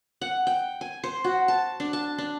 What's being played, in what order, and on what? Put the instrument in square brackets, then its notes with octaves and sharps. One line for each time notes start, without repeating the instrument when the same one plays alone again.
[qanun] F#5
G5
G#5
C5
F#4
A5
D4
A5
D4